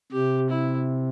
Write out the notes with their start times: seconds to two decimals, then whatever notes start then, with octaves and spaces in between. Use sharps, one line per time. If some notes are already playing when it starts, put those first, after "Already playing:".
0.12 C3 G4
0.50 E4